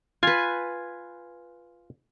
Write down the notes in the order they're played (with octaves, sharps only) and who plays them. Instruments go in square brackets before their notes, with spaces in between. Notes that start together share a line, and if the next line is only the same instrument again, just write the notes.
[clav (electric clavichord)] F4 [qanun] B4 G#5